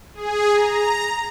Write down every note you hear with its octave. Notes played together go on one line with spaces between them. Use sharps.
G#4
A#5